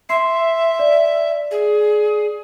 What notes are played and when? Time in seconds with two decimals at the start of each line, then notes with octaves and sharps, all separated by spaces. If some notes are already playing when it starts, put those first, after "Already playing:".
0.09 E5 C6 C7
0.79 D5
1.51 G#4